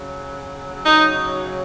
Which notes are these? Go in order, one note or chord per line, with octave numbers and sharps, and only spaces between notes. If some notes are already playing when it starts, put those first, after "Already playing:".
Already playing: C#3 F#3
C#3 F#3 D#4